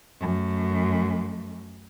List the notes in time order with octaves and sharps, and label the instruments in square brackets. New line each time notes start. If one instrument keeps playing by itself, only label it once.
[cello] F#2 A3